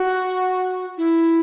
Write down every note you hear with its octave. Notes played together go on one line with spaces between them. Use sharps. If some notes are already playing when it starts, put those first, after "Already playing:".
Already playing: F#4
E4